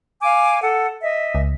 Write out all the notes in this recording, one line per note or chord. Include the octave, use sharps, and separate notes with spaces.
F5 G#5 D6
A4 F#5
D#5 E5
C#2